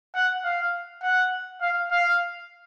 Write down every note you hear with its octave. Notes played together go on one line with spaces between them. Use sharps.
F#5
F5
F#5
F5
F5